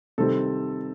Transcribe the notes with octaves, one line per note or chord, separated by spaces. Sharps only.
C3 D#3 G3 C4 A4